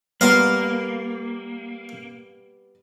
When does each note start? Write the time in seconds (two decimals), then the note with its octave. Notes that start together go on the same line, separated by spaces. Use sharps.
0.21 G3 A#3 B3 F5 A#5 C6